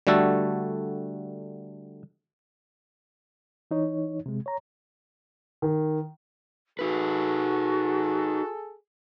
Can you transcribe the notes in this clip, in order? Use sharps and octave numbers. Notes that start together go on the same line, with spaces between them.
D3 G3 A3 F#4 A4
E3 D#4 C#5
C3 G#3
C#5 A#5
D#3
D#4 F#4 G#4 A4 B4